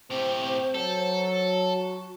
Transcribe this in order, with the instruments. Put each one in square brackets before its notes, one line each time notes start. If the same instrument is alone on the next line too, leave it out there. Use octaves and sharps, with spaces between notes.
[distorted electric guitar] A2 G4 [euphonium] C4 [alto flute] C5
[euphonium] F#3 [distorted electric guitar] A4
[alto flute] F#4